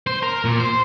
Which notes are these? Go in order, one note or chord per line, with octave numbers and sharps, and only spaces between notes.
C5
A#4
A#2
C5